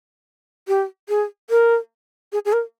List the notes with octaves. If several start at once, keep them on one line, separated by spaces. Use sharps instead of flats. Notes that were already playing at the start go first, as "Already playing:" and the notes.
G4
G#4
A#4
G#4
G#4
A#4